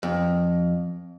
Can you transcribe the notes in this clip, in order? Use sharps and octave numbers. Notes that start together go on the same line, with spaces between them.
F2